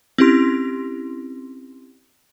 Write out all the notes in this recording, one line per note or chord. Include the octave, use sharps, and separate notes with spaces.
C4 C#4 E4 G4 C6